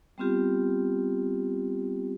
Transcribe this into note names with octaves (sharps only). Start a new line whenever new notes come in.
G3 B3 C4 F4 G4